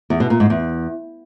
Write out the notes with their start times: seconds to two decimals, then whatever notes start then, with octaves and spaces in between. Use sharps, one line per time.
0.10 E2
0.20 B2
0.30 A#2
0.40 G#2
0.50 E2